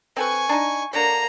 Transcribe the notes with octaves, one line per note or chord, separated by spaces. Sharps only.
C4 A4 B4 G#5 C#6
D4 D#4
D3 A#3 D4 C#5 A#5